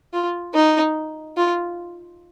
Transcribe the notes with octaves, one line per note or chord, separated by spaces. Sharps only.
F4
D#4
F4